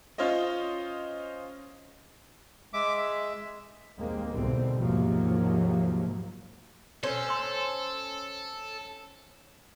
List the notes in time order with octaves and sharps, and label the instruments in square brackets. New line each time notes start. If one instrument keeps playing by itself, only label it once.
[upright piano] C#4 F4 C5 C#5 D#5
[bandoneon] G#3 [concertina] E5 D6
[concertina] E5
[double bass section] D#2 G#3 A#3 C4
C2 G#2 B2 D3 C4
D#2 G#2 C3 F3 F#3 A#3
[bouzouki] C#4 C5 [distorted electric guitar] A4
[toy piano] C6 E6